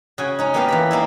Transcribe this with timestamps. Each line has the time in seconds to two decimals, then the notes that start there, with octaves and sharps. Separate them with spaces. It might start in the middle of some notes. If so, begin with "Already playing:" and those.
0.18 C#3 F#4 G#5
0.39 C#4 D#4
0.54 A#3 B3 F4 G4 D#5 F5
0.68 E3 A#5 B5
0.91 A#3 D#4 E4